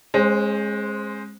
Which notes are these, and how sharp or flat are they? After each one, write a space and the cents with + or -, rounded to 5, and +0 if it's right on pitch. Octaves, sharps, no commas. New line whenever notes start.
G#3 +0 C#4 -40 C5 +0